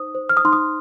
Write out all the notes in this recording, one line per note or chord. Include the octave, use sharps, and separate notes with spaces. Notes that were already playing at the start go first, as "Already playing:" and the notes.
Already playing: D#4 C5 D#6
C5
F6
D#6
D#4 C6
D#6